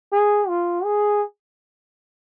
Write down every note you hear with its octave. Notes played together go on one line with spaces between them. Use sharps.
G#4
F4
G#4